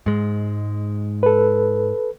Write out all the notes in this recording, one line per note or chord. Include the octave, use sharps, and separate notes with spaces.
G#2 G#3
A4 B4